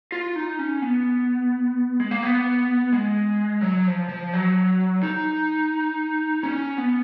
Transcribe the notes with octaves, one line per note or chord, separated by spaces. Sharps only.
F4
D#4
C#4
B3
G#3
A#3
B3
G#3
F#3
F3
F3
F#3
D#4
C#4
B3